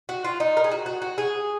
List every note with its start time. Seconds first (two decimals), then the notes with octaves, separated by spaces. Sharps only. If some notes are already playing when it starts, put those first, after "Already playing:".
0.09 F#4
0.25 F4
0.40 D#4
0.57 A#4
0.64 G#4
0.72 F#4
0.86 F#4
1.02 F#4
1.18 G#4